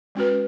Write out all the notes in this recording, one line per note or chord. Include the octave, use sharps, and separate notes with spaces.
G#3 C#4 F#4 B4